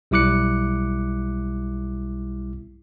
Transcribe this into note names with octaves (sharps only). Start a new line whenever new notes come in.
B1 G3 E4 D6 F#6 C#7